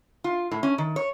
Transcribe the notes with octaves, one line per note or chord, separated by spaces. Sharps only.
F4
A2
C#4
D#3
C#5